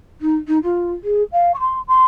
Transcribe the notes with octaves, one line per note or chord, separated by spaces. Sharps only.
D#4
D#4
F4
G#4
F5
C#6
C6
C6